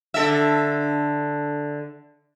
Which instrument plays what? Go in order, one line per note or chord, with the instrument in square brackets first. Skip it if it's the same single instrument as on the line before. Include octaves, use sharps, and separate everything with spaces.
[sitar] D3 A4 E5